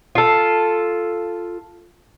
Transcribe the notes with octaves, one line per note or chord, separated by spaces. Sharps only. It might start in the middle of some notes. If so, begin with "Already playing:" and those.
F4 A4